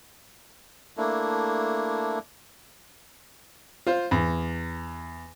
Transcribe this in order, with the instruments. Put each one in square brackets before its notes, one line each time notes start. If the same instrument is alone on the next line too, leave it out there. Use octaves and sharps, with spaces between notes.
[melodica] A3 A#3 D4 E4
[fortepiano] F4 C5
E2